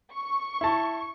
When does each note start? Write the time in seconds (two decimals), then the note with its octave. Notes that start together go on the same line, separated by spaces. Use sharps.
0.13 C#6
0.61 E4 A5